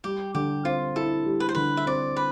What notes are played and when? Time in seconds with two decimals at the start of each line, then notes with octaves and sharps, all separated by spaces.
0.04 G3 G4
0.35 D3 G4
0.65 C4 F4
0.96 E4 A4
1.26 G3
1.40 B4
1.49 C5
1.55 D3 B4
1.77 E5
1.86 C4 D5
2.16 B4